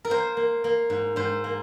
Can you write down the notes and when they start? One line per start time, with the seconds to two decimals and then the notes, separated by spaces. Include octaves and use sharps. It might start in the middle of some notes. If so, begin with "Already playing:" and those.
0.05 A#4
0.10 A#3 C5
0.37 A#3
0.64 A#3
0.90 G#2
1.16 G#2 C5
1.44 A#3